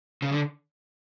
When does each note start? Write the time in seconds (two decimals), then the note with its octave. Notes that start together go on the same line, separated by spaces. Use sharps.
0.22 C#3
0.32 D3